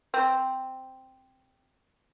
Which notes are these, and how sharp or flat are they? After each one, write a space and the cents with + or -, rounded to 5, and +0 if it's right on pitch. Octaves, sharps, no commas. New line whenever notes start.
C4 +0